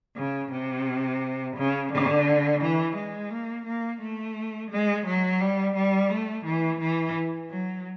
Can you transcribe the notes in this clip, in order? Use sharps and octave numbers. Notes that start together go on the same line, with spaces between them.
C#3
C3
C#3
D3
E3
G#3
A#3
A#3
A3
G#3
F#3
G3
G3
A3
E3
E3
F#3